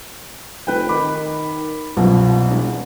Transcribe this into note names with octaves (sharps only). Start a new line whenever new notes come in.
F1 B4 G5
D#3 B5 D6
C2 F#2 B2 F3
E1